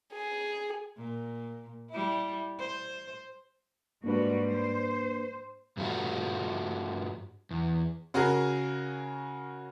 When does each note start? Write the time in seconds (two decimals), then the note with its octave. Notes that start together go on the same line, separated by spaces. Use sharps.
0.13 G#4
0.97 A#2
1.90 G3 E4
2.58 C5
4.04 G#2 G3 A#3 D4 F#4 B4
4.54 C5
5.77 G2 F3 G3 A3 F#4
7.51 E2
8.14 C#3 F#4 G#4 A#4